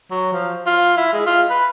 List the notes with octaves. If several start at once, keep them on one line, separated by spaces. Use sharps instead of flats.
F#3
F3
F4
E4
G#3
F4
B4